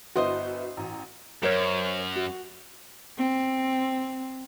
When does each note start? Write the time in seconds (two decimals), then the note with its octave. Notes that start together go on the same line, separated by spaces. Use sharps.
0.16 G1 B3 E4 F#4 C5 D#5 C6
0.77 A1 A#5
1.43 F#2 A#4 C5 C#5
2.16 F#4
3.18 C4